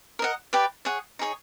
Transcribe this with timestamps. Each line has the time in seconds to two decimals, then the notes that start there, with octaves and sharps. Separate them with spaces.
0.19 A#4 D#5 F#5
0.53 G4 B4 D5
0.85 G#4 C#5 F#5
1.19 D#4 G#4 C#5